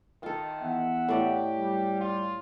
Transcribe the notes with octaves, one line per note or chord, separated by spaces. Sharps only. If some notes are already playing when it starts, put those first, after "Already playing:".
D#3 F4 A4
E2 E5 F#5
A2 G4 D5 D#5
G3
F4